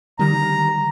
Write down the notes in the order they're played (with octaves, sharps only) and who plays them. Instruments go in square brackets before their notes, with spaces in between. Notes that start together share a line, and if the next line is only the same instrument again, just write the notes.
[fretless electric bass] D3 D#3 G3 [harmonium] A#5